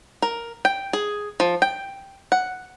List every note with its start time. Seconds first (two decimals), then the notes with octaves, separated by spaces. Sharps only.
0.22 A#4
0.65 G5
0.93 G#4
1.40 F3
1.62 G5
2.32 F#5